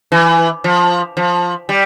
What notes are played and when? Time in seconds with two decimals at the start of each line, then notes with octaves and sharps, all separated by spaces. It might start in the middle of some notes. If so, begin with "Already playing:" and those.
0.12 E3
0.64 F3
1.17 F3
1.69 G3